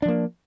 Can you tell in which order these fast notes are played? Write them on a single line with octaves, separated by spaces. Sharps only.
D4 F3 A#3